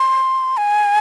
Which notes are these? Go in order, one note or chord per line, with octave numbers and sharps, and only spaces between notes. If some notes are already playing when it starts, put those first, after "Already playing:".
Already playing: C6
G#5